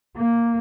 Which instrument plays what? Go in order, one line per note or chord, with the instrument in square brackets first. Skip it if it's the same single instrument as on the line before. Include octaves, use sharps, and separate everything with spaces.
[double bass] A#3